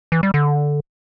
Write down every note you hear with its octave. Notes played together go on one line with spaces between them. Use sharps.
E3
G3
D3